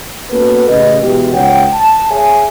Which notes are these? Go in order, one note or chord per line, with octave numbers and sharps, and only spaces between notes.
A#3 B3 C#4 F#4 A4 B4
A1 C#3 B4 D#5
B2 E3 G#3 D#4 G4
C#2 C#5 F#5 G5
A5
G#4 C#5 E5 G#5